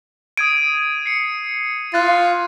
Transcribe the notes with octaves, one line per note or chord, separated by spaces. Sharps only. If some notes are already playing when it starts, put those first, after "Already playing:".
D#6 G#6 D7 D#7
C7 C#7
F4 F#6 A6